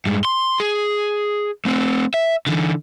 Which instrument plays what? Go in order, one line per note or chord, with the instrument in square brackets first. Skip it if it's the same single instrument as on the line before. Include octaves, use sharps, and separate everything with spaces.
[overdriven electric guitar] G2 G#3
C6
G#4
A3 C4
E5
D3 E3